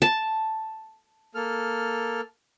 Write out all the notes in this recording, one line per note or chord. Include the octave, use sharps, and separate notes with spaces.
A5
A#3 A4 F6